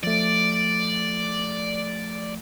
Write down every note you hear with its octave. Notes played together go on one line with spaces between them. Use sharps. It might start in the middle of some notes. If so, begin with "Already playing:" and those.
F3 A3 D5